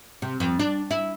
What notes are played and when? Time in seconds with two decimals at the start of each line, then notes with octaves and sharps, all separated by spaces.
0.22 C3
0.40 F2
0.59 D4
0.91 E4